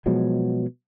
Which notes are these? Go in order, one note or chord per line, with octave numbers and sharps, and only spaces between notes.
B2 F3 F#3 G#3